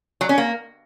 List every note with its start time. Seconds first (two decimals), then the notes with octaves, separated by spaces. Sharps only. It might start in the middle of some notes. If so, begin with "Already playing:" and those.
0.21 F#3
0.29 C#4
0.38 A#3